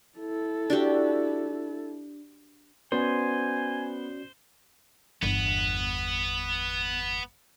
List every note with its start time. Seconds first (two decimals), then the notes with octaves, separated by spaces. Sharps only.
0.18 E4 A4
0.70 D4 F#4 G4
2.92 B3 C#4 F#4 C5 D5 G#5
5.22 G1 E2 B3